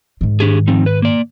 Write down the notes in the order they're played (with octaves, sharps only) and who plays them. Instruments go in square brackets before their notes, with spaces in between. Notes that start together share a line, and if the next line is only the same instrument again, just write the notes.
[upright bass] G#2 D#3
[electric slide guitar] D4 G4 G#4
F3 C4 D#4
B4
A#3 D5